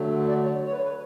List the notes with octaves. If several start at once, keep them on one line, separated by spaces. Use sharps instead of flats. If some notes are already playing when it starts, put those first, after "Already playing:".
Already playing: D3 F#3 A3
D5
C#5
C#5
B4
B4